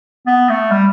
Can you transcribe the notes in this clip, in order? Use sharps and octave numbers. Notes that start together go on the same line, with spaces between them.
B3
A3
G3